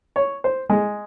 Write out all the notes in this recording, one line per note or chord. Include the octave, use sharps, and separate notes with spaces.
C#5
C5
G#3